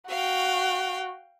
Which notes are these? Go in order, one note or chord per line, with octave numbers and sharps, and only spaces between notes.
F#4 F5 G5